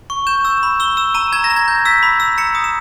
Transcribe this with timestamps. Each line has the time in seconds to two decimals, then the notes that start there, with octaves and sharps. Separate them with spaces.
0.10 C#6
0.27 G6 E7
0.45 E6
0.63 B5
0.80 E6 G7
0.97 E6 E7
1.14 A#5 D#7
1.32 A#5 G#6
1.44 A#6
1.50 A#5
1.56 G#6
1.68 G6
1.85 E6 B6
2.03 B5
2.20 E6
2.38 A#5 C#7
2.55 D#6
2.64 E7